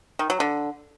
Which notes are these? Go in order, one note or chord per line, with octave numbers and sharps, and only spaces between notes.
D#3
F#3
D3